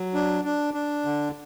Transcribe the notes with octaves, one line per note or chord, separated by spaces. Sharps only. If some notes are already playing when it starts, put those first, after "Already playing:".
Already playing: F#3
D4
D4
D4
D3